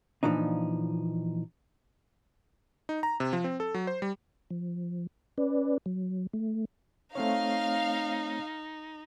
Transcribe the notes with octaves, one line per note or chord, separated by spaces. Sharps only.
A#2 E3 F3 D4 D#4
D#4
A#5
C3
F3
C4
A4
F#3
C5
G3
F3
C#4 B4 D5
F#3
A3
A3 C4 D#4 C#5 F5